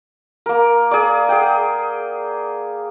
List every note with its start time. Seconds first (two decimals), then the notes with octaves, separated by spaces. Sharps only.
0.46 A#3 A#4
0.91 G#4 D5
1.29 G#4 F#5 G5